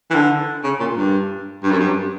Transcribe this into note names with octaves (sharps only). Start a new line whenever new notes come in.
E3
D3
C#3
A#2
G2
G2
F#2
G2